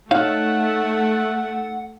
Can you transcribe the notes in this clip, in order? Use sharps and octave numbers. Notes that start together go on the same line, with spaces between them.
A3 D#4 C#5 F5 F#5